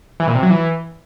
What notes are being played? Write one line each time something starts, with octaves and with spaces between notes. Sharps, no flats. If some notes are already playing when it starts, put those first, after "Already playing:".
E3
A#2
C3
F#3
E3